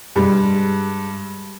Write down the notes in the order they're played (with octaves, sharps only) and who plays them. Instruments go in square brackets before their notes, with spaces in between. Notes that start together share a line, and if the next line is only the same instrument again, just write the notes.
[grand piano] G2 G3 G#3